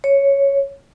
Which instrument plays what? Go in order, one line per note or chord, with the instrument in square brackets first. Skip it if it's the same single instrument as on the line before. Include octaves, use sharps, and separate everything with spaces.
[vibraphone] C#5